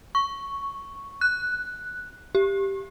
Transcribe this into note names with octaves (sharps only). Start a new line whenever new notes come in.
C#6
F#6
G4